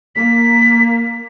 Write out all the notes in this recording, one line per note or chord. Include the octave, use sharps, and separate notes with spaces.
A#3 B6